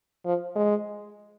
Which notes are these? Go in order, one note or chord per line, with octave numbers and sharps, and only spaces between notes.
F3
G#3